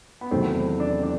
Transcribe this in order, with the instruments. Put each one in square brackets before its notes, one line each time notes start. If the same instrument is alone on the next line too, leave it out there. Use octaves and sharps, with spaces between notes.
[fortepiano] B3
[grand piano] E2 C3 D#3 F#3 A3 [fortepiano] C4
[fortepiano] D4
D4